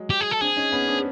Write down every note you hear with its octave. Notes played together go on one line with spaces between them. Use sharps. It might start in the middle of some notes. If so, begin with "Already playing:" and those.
Already playing: F#3 G#3
G4
G#4
A4
C4 D4 G#4
C#4 D#4
B3 C#4
C4 D4